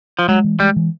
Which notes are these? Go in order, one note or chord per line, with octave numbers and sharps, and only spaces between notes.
F3
F#3 G#3
E3
G3 G#3
E3